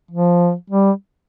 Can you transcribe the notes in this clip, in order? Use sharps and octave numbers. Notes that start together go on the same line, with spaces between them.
F3
G3